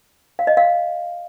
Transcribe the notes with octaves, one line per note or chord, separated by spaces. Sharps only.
F5
D#5
F5